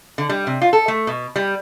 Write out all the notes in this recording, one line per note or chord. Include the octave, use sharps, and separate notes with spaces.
D3
G3
C3
F4
A4
A3
B2
G3